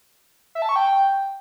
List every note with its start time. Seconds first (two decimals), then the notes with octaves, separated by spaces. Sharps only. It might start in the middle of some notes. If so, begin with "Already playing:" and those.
0.55 E5
0.62 A5
0.69 C#6
0.76 G5